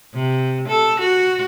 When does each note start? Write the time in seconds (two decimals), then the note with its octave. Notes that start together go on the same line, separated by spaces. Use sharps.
0.14 C3
0.68 A4
1.00 F#4